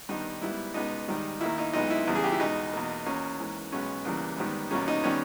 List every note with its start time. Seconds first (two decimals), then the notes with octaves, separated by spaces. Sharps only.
0.09 G2 D#3 G3 B3 D#4
0.41 G#2 G3 B3 E4
0.74 C#2 B2 G#3 B3 D#4
1.08 G#2 D#3 G3
1.41 D#2 D#3 A#3 E4
1.58 D#4
1.73 B1 A#2 G#3 B3 D#4
1.90 E4
2.07 E2 C#3 G3
2.15 G#4
2.24 G4
2.32 E4
2.39 E2 B2 G#3 D#4
2.73 E2 B2 A#3
3.06 E2 B2 A#3 C#4
3.39 G#2 E3 A#3
3.72 B1 B2 G#3 B3 C#4
4.05 E2 C#3 E3 G3 A#3
4.38 G#2 D#3 G3 B3
4.71 E2 B2 G3 A#3 C#4
4.88 D#4
5.04 D#3 G3 B3 C#4